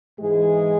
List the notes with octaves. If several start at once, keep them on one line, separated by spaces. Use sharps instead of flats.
G#2 E3 G#3 G#4